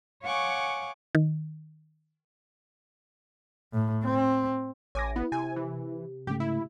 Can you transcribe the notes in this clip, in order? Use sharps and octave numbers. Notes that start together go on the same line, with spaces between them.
C#5 F5 F#5 G#5 C#6 D6
D#3
A2
C4
A1 C#5 G#5 D6 A#6
B3 E4
C3 G#5
E3
G#2 C#3 A3 G4
E4